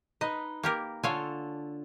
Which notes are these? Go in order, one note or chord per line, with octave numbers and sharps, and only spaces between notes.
D#4 B4 D#5
A#3 G4 A#4
D3 F4 A4 C#5 F5 G#5